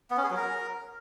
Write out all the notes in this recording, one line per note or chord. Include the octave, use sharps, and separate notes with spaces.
B3
C#4
G#4
F#3
A#4